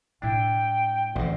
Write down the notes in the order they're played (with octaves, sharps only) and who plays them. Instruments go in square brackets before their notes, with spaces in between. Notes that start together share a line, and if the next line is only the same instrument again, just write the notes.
[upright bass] A2 G#3 [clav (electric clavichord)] D4 E4 [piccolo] G5
[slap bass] A1 A2 [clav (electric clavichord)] D2